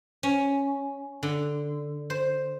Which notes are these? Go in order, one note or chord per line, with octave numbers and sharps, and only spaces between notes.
C#4
D3
C5